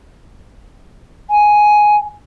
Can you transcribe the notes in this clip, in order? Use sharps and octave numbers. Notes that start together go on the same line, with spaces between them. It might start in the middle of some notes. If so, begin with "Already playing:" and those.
G#5